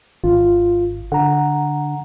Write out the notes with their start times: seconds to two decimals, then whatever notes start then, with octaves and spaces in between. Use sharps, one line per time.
0.24 G#1 F4
1.12 D3 F#5 A#5